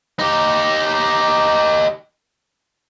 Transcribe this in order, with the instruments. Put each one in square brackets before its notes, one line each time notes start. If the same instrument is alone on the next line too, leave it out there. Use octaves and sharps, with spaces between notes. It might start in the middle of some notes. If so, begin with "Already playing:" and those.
[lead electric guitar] D#4 G4